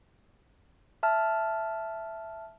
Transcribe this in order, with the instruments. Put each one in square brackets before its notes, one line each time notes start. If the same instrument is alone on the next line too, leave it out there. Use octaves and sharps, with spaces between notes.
[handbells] E5 A5 F6